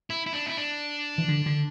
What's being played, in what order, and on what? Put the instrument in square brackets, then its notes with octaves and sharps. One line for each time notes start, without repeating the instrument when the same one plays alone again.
[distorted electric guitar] E4
E4
D4
E4
D4
[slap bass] E3
D3
D3